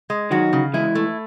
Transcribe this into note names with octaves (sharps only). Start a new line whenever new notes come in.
G#3
D#3 F#3 F#4
C#3
E3 G#3 E4
A3